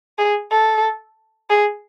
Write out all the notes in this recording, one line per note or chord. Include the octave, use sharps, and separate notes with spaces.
G#4
A4
G#4